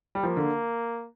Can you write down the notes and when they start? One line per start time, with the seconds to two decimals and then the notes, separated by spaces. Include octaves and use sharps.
0.15 G3
0.23 F3 A#3
0.37 D3